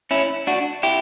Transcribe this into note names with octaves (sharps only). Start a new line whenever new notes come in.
C#4 E4
D4 F#4
E4 G4